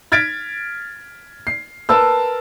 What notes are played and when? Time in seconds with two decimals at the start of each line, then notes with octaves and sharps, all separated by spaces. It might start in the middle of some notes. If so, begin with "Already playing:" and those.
0.12 F6 G#6 A6 B6 D7
1.47 C7
1.89 A#4 B4 A5 E6